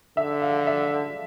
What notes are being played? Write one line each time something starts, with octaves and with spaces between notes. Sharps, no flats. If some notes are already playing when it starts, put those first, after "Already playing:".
D3 E5
F5
E5